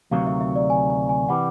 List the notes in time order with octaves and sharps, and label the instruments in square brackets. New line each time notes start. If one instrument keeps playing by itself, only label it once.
[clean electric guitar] D2 C3 D#3 F#3 [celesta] F5
[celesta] E5
E5
D5
G#5
G#5
G#5
[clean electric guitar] C3 E3 G3 [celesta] F#5